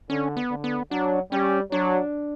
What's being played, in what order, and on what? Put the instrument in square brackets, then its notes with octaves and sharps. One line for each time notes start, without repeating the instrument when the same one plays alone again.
[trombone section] D3 [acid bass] C#4
[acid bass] B3
[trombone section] D3
[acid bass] B3
[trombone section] F#3 [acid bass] D4
[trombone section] G3 [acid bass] C#4
[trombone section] F#3 [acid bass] D4